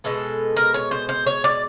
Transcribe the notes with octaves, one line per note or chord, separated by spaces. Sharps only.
B2 G#3 B3 A4
A#4
C#5
C5
C5
C#5
D5